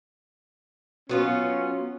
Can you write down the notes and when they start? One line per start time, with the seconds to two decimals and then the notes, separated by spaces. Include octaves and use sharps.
1.09 F#3 B3 C#4 F4